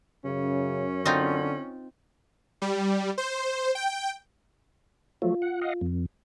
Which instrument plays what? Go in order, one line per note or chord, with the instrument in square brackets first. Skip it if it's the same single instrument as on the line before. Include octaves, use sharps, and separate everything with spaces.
[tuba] F#2 [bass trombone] C#3 [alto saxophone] C#4
[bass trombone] D3 [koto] C4 D#4 F4
[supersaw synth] G3
C5
G5
[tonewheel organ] F3 F#3 A3 [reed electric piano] F4
[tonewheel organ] F#5
D#5 F5 F#5
F2